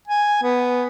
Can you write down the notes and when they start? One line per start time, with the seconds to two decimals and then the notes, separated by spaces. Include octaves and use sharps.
0.08 G#5
0.43 B3